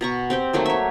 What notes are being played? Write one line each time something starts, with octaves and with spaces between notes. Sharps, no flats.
B2 A#5 C#6
C4 G4 C5
D#3 F#3 A3 A#3
C#5 E5